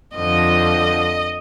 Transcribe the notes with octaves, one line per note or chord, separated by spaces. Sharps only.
F2 D3 F3 D#5